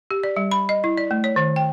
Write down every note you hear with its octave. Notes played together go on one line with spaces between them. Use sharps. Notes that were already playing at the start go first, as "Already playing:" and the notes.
G4
D5
G3
B5
D#5
E4
D5
A3
C#5
D#3
G5